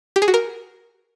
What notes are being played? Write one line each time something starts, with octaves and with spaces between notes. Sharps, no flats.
G4
G#4
F#4
A#4